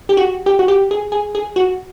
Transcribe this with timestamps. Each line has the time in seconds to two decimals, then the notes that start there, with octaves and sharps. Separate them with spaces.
0.09 G4
0.17 F#4
0.46 G4
0.59 F#4
0.68 G4
0.91 G#4
1.12 G#4
1.35 G#4
1.56 F#4